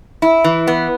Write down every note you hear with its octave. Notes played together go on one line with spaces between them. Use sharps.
E4
E3
B3